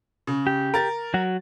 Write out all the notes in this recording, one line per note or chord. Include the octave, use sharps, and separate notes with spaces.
C#3
G4
A#4 A6
F#3 F#4